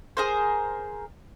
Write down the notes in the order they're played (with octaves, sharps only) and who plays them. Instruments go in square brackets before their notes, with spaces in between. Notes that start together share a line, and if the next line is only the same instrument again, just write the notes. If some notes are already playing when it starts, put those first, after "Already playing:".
[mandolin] G#4 A#4 C5